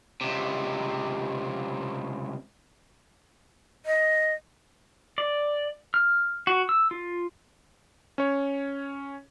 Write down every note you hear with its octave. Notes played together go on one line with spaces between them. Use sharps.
C#2 C3
D#5
D5
F6
F#4
E6
F4
C#4 C#5